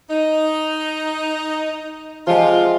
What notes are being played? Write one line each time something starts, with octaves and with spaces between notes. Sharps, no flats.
D#4
C3 F3 G#3 F4